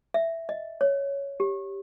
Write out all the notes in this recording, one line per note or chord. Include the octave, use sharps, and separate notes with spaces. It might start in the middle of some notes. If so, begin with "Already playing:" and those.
E5
D#5
C#5
G4